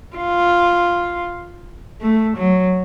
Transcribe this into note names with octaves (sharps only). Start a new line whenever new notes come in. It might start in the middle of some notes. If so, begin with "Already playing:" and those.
F4
A3
F#3